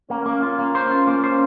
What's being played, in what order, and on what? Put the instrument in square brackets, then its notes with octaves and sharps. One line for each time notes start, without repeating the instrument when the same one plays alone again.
[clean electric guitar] A#3 [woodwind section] C#4
[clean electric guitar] A#3
[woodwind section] C#4 [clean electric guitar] F4
[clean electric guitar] A#3
[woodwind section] C#4 [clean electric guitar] C5
[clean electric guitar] F4
A#3
C5